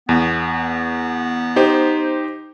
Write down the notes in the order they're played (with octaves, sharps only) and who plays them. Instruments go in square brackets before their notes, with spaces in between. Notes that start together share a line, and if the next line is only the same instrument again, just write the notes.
[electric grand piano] E2 [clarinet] B3
[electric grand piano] D#4 G4 C5